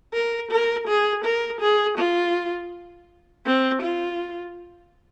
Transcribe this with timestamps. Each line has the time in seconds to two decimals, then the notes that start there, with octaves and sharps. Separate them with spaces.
0.14 A#4
0.51 A#4
0.87 G#4
1.24 A#4
1.61 G#4
1.98 F4
3.45 C4
3.82 F4